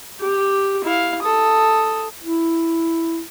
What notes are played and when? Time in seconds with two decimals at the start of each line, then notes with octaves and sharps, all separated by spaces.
0.20 G4
0.84 E4 F5
1.21 A4 D#6
2.23 E4